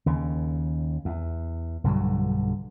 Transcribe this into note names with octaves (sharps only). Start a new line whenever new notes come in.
D#2 C#3
E2
B1 G2 D3 F#3